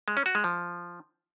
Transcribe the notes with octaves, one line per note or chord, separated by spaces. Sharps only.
G#3
C#4
F#4
G#3
F3